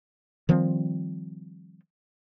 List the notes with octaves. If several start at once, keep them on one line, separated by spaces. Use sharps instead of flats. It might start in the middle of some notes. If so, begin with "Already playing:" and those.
D#3 F3 G3 C4